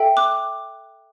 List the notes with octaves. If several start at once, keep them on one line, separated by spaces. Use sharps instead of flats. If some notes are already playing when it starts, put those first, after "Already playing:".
Already playing: A4 E5 G5
D6 F#6